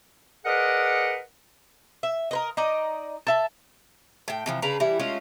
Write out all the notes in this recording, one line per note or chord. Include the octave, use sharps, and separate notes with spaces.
G#4 A#4 B4 D5 D#5 F#5
E5
A#4 B4 D#5
D#4 D5 D#5
A4 E5 A5
A2 G5
C3 E3 F3
C#3 D4 B4 A#5
E3 G3 E4
G#3 A3 C#4 F4